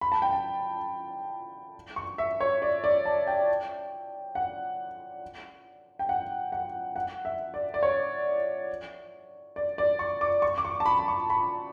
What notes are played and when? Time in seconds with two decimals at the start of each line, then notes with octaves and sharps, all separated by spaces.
0.01 B5
0.12 A5
0.22 G5
0.33 A5
1.96 C#6
2.18 E5
2.41 C#5
2.62 D5
2.84 D5
3.05 A5
3.27 G5
4.35 F#5
5.99 G5
6.09 F#5
6.52 F#5
6.96 F#5
7.25 E5
7.54 D5
7.74 D5
7.83 C#5
9.56 D5
9.78 D5
9.99 C#6
10.21 D6
10.42 C#6
10.58 D6
10.65 C#6
10.80 A5
10.86 B5
10.99 B5
11.08 C#6
11.30 B5